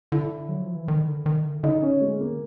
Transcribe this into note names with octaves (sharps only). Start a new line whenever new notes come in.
D3 E4
F#3
F3
E3
D#3
D3
D#3
D3
D3 D#4
C#4
G#3
A#3